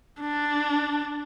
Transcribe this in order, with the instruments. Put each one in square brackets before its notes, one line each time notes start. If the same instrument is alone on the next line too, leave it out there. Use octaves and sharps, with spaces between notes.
[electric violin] D4